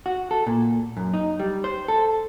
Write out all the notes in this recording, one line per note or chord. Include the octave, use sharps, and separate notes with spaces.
F#4
A4
A#2
F#2
D#4
G3
C5
A4